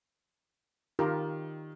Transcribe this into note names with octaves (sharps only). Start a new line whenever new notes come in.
D#3 F4 G4 A#4